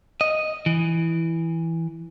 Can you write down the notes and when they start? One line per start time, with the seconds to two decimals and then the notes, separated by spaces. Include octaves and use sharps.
0.21 D#5
0.66 E3